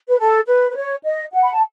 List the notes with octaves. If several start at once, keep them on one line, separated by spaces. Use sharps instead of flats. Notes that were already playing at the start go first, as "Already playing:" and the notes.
B4
A4
B4
B4
C#5
D#5
F#5
B5
A5